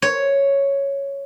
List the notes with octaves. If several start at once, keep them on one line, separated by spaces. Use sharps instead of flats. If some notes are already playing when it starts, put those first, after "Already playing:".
C#5